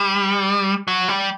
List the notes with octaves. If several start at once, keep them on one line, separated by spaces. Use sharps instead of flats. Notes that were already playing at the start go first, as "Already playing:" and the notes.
Already playing: G3
F#3
G3